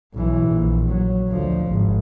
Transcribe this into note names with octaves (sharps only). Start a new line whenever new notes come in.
B1 E3
A#1
F#3
D2 F3
G#1